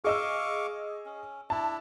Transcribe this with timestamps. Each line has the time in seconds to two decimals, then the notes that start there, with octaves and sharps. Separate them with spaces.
0.04 G#4 D#5 F5 C#6 D6 E6
1.06 C#4
1.50 D4 E4 A5